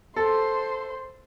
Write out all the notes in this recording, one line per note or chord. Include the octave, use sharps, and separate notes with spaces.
A4 C5 C6